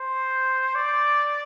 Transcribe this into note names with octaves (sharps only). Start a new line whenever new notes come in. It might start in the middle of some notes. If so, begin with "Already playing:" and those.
Already playing: C5
D5